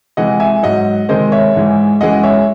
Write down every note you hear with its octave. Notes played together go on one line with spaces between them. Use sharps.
C3 E3 G#3 D#5 F#5
E5 G#5
G#2 F#3 D#5 F#5
C3 D#3 G#3 C5 D#5
C#5 E5
G#2 E3 G#3
F#2 E3 G#3 D#5 F#5
C#5 E5